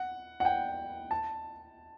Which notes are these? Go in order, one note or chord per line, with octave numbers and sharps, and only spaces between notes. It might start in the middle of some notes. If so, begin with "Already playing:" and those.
Already playing: F#5
F#5
G5
A5